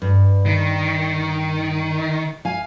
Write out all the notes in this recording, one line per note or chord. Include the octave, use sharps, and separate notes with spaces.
G2
D#3
F5 G#5